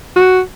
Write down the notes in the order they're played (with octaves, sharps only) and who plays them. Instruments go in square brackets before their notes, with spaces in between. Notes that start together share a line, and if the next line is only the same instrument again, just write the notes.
[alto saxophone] F#4